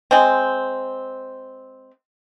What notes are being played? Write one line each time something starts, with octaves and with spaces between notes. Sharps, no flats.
G#3 C4